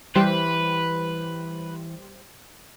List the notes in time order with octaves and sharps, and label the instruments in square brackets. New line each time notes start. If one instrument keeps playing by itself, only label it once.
[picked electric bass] E3 [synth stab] G3 G4 C5 [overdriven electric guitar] B4